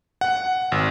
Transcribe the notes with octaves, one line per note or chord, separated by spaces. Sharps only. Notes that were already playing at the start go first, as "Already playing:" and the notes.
F#5
G#1